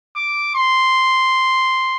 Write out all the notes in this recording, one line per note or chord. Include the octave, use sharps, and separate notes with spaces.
D6
C6